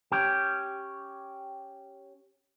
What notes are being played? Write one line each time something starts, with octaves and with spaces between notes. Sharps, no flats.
C#4 G4